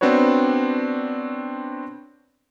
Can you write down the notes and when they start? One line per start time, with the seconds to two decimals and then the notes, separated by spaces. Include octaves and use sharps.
0.01 B3 C4 D4 F#4 B4 C#5